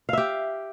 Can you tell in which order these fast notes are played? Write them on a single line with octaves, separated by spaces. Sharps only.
F5 E5 G4